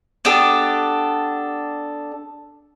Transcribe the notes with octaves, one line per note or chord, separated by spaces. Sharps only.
B3 D4 G4 A4